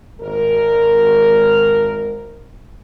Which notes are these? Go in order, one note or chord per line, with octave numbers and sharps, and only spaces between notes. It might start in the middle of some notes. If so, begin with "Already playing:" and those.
G#1 A#4